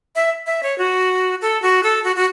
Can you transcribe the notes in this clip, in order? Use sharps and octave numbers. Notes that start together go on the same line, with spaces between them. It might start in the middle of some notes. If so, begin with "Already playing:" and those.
E5
E5
C#5
F#4
A4
F#4
A4
F#4
F#4